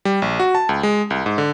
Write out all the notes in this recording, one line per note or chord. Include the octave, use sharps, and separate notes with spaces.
G3
A#1
F#4
A5
C#2
G#3
C2
G#2
D3